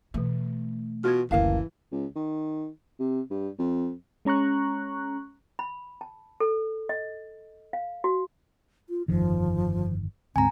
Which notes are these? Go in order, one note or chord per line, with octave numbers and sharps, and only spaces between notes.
B2 E3 A3
B2 F4 F#4 F6 G#6
F#1 D2 E3 A#4 F5 A5
C#2
D#3
C3
G2
F2
G#3 C#4 A#5 C#6 F#6
B5
A5
A4
D#5
F5
F#4
F4
G1 F2 D#3 F3
D2 G#2 C4 G#5 A#5